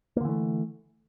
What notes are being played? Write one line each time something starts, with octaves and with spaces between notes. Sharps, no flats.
D3 E3 A3 A#3